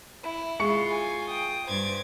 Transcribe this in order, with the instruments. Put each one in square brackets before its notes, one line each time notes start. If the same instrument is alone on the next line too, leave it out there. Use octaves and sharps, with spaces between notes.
[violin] E4
[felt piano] G#3 C#6 C#7 [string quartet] F4
[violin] G#5
G5 D#6
[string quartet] G2 D6 G#6 [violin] C5